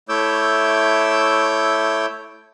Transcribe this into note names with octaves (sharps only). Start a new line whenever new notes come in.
A3 E4 C#5 D6 E6 G6